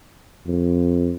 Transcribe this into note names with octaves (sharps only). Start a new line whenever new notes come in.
F2